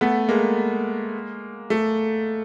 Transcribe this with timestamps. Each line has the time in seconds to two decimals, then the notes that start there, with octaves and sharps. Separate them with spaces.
0.01 A3 B3
0.29 G#3 A#3
1.70 A3